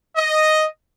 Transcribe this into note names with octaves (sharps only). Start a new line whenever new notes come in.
D#5